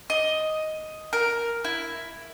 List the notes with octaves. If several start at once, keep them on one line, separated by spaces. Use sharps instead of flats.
D#5
A#4
E4